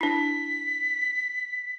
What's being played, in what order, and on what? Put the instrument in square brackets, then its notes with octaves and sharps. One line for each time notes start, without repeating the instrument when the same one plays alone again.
[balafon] D4 E4 [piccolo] B6